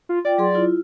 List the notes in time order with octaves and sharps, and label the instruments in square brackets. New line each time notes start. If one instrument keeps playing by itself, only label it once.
[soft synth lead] F4
[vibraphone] F4 G5 [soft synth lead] D5
[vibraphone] F#3 G#4 C6
E4 F4